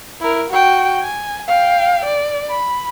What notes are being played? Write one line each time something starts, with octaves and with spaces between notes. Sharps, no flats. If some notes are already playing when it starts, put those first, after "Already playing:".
E4 A#4
F#4 G5
G#5
F5 G5
D5
B5